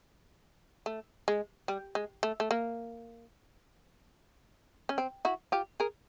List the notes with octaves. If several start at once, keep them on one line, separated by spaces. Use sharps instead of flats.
A3
G#3
G3
G#3
A3
A3
A#3
C#4
C4
E4 F#4
F4 G4
G#4 A#4